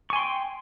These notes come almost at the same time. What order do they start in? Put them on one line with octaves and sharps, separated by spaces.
C#6 G#5 C6 G5